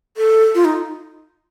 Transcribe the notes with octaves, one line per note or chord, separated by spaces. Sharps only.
A4
F4
D#4